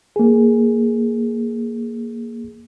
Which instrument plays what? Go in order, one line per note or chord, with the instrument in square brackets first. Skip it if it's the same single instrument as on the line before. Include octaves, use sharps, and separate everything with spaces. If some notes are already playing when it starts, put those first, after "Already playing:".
[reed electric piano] A#3 G#4